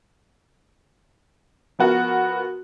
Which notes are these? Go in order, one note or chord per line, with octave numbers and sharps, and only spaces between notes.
F3 B3 F#4 A#4